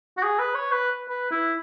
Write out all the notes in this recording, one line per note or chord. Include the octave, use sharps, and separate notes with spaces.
F#4
G#4
B4
C#5
B4
B4
E4